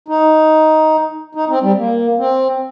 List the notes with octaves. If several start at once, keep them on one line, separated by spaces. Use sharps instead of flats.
D#4
D#4
C4
G3
A#3
C4